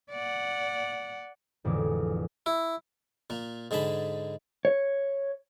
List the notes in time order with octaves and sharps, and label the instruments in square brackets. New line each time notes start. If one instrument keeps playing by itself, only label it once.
[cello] D5 F#5
[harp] A1 F2 D3 G#3 D6
[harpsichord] E4
A#2 A#3
G#2 D3 G#4 A5 B5
[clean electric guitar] C#5